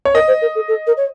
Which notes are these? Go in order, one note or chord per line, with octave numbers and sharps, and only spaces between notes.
C#5
A#4 D#5
C5
A#4
A4
A4
A#4
C#5